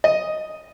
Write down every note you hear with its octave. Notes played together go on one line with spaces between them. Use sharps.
D#5